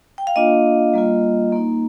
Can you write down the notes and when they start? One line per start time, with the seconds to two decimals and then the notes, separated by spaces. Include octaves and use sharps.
0.18 G5
0.27 F5
0.36 A#3 D4 F4 D#5
0.94 G3 A#3 F4
1.53 A#3 D#4